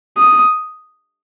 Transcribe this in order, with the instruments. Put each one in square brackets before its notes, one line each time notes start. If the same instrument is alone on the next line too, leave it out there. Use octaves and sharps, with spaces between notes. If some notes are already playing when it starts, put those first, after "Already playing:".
[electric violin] D#6